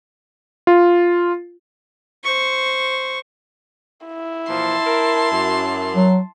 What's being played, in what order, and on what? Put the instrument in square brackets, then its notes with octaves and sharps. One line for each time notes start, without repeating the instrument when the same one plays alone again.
[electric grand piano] F4
[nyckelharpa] C5 C#6
[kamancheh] E4
[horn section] A#2 E3 F3 [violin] A5 C6
[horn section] A#4
F#2
[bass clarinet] F#3